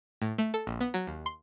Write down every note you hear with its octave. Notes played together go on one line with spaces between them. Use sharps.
A2
A3
A4
A#1
B3
F#3
D#2
C6